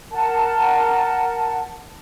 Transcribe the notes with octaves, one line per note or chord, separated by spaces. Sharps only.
A#4 F#5 A5